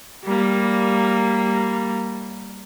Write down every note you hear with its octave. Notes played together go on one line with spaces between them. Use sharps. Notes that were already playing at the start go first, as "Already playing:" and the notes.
G3 A#3